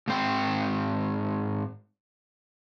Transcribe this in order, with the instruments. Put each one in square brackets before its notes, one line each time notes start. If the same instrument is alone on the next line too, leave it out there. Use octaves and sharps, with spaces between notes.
[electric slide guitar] G#2 G#3 C4 G5